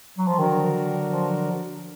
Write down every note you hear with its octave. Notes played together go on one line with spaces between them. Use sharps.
F#3
F3
D3 D#3 F#3 D4 F#4 A#4
F3